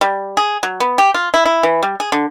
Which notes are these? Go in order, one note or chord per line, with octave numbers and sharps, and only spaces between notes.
G3
G#4
F#3
B3
G4
F4
E4
E4
E3
G3
G#4
D3